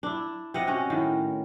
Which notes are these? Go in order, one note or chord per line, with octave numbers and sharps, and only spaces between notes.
D4 E4
C3 D#5 F#5
C#4 F#4
A2 D#3